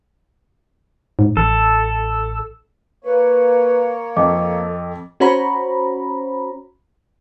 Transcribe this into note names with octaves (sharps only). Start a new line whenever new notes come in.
G#2
A1 A4
A#3 B4 C#5
F2 A4 D#5 D6
C#4 F#4 C5 C#5 A#5 B5